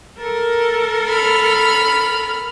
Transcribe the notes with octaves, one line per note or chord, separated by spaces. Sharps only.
A4 A#4
B5 F6